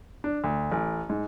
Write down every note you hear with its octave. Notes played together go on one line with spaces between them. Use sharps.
D4
D2
A1
G#2